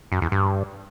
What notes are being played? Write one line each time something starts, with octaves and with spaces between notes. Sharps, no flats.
F#2
E2
G2